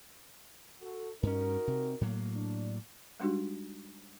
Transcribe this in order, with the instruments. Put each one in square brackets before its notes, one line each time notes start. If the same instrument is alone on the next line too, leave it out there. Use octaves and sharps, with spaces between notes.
[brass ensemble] F#4 A4
[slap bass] G2 C#4 [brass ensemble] D#4 F#4 A#4
[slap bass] C3
A2 F#3 A#3
[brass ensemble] D4
[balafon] G3 G#3 D4 D#4 F#4 G4